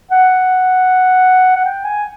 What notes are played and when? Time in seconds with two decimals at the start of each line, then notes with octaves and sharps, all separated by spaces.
0.11 F#5
1.56 F#5
1.65 G5
1.84 G#5